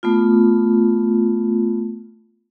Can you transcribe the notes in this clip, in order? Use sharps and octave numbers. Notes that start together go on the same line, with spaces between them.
A3 B3 F4